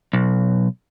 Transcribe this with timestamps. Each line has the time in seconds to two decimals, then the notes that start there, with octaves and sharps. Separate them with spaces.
0.13 B1